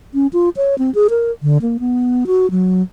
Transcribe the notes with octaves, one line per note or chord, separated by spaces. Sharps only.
C#4
F4
C#5
C4
G#4
A#4
D3
A#3
B3
F#4
F#3